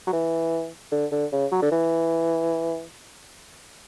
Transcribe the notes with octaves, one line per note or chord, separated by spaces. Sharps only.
F#3
E3
D3
D3
C#3
F#3
D3
E3